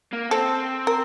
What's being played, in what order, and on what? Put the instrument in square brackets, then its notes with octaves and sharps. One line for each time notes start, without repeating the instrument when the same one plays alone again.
[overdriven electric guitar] A#3
[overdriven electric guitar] C4 [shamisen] A4
[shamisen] A#4